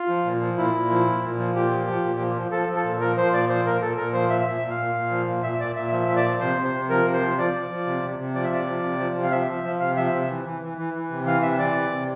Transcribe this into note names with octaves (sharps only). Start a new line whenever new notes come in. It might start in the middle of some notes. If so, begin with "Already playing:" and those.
Already playing: F4
F3
A#2
F3
A#2 E4
A#2
F3
A#2
A#2
F3
A#2 G4
F3
F3
A#2
F3
F3
F3 A4
F3
A4
A#2
F3 A#4
F3 C5
A#2 D5
F3 C5
A#2 A#4
A#2 A4
A#2 A#4
F3 C5
A#2 E5
A#2 E5
A#2
F5
A#2
A#2
F3
A#2
A#2 E5
A#2 D5
A#2 E5
F3 E5
A#2 E5
D5
F3
C3 C5
C3
C5
C3
F3 A#4
C3
C5
F3
F3 D5
F3
F3
C3
C3
C3
F3 D5
E5
C3 D5
F3
C3
F3
C3
F5
F3 E5
F3
F3
C3 F5
F3 E5
C3 E5
E3
E3
E3
E3
E3
C3
E3 F5
C3 E5
E3 D5
C3
C3